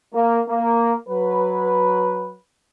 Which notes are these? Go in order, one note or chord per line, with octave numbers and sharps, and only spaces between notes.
A#3
A#3
F#3 B4